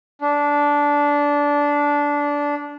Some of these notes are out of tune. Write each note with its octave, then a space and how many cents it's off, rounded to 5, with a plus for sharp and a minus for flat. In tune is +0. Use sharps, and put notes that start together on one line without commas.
D4 -15